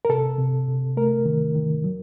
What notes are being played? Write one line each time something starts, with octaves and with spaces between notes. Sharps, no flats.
A#4
C3 A4
C3
C3
A3 A#4
D#3
D#3
F#3